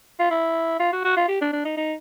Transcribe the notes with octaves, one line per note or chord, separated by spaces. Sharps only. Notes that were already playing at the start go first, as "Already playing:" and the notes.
F4
E4
F4
F#4
F#4
F4
G4
D4
D4
D#4
D#4